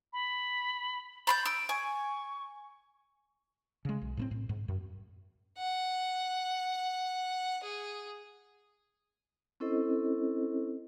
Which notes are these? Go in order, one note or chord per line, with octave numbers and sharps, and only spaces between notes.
B5
B5 C6 G6 A6
E6 D7
G#5 C#6
C#3 G#3
B1
A2 A3 C4
A2
G#2
F#2
F#5
G#4
C4 C#4 E4 A4 C5 D#5